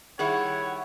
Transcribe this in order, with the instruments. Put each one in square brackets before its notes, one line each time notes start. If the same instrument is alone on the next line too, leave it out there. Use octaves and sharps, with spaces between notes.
[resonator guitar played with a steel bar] D#3 G3 E4 [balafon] G#4 E5 [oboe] C#5 [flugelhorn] F#5